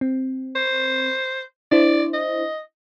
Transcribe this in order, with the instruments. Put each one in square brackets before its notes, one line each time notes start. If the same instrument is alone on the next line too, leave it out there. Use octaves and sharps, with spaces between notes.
[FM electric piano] C4
[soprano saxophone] C5
[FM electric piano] D4 E4 C5 [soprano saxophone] D5
[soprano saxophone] D#5